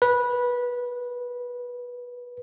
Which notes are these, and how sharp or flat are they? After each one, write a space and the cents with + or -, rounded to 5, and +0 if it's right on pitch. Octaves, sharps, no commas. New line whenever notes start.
B4 -15